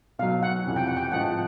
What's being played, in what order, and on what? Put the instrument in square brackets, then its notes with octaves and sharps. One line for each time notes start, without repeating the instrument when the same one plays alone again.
[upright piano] B1 B2 F#3 [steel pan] F5
[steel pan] F#5
[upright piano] F2 C3 E3
[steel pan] G5
F#5
G5
[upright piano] A1 G#2 F3 [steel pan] F#5